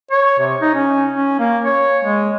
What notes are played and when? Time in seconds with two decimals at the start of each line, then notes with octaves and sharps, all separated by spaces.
0.11 C#5
0.39 C3
0.61 D#4
0.74 C#4
1.13 C#4
1.39 A#3
1.64 C#5
2.04 G#3